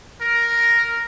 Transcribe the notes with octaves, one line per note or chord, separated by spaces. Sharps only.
A#4